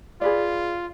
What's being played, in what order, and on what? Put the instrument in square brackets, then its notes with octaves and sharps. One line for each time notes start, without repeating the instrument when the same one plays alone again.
[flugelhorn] F4 [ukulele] G#4 B4 D5